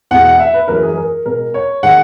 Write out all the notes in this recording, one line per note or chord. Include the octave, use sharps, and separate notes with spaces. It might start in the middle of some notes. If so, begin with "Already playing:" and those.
E2 B2 G#3 F#5
F#5
E5
B4
F#2 E3 G#3 A#4
G#4
A#4
B2 G#3 A#4
C#5
D#3 G#3 F#5